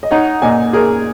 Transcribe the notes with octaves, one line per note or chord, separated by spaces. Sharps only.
D#5
D#4 C#5 F#5
A#2 D#5 G#5
G#4 A#4